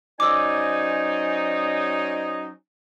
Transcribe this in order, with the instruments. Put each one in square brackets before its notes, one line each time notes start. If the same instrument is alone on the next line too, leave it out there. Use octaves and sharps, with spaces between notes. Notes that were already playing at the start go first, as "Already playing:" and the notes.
[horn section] F#3 C#4 D#4 [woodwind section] C5 D5 G#5 [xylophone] D6 E6